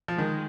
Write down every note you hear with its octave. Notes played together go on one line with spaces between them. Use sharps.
F3
D#3 G#3